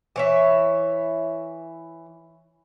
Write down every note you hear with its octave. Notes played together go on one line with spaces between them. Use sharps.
E3 C#5 E5